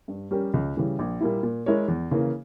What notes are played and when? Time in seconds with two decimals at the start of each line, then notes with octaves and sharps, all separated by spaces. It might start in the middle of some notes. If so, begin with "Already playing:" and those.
0.08 G2
0.31 G3 C#4 G4 A#4
0.54 C#2
0.77 C#3 E3 G3
0.99 A#1
1.20 A#2 G3 A#3 E4
1.43 A#2
1.66 G#3 E4 A#4 C#5
1.88 E2
2.11 C#3 E3 A#3